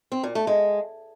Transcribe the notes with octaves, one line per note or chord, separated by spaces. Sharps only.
C4
A#2
A3
G#3